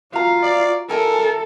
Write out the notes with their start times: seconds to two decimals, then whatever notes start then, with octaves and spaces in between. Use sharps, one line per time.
0.13 F4 F#4 F5 A#5
0.43 D5
0.89 E4 A4 A#4 G#5